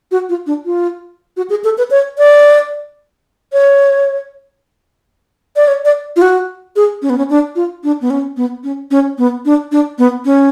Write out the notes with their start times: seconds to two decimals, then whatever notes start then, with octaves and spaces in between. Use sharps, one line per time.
0.11 F#4
0.29 F4
0.47 D4
0.66 F4
1.37 F#4
1.50 G#4
1.64 A4
1.78 B4
1.91 C#5
2.18 D5
3.53 C#5
5.56 D5
5.68 C#5
5.85 D5
6.16 F4
6.22 F#4
6.76 G#4
7.02 C#4
7.10 B3
7.18 C#4
7.30 D4
7.56 F4
7.84 D4
8.02 B3
8.10 C#4
8.37 B3
8.64 C#4
8.91 C#4
9.18 B3
9.45 D4
9.72 D4
9.98 B3
10.25 C#4